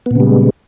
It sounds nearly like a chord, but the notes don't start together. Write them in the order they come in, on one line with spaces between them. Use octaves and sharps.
B3 A#2 C#3 G3 G#3